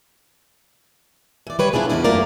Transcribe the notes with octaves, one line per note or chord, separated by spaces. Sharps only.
E3 D5
G3 B4 C#5
D4 E4 F4 G#4 C5
E2 G2 A#3 C#4 D4 E4
F#2 A3 A#3 F4 A#4 D5